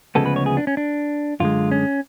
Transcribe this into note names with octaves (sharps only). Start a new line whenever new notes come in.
D2 C#3 F3 G#3 B3 A4
B4
C#5
G#4
D4
C#4
D4
F#2 D3 G#3 F4
C#4